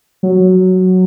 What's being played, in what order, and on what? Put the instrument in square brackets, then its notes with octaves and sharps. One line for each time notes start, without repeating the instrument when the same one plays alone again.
[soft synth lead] F#3